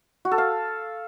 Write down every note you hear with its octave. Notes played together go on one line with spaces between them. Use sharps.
F#4
A4
F5